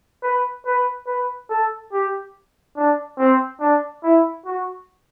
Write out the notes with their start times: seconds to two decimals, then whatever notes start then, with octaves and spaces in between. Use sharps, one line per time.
0.23 B4
0.66 B4
1.07 B4
1.50 A4
1.92 G4
2.77 D4
3.18 C4
3.60 D4
4.03 E4
4.46 F#4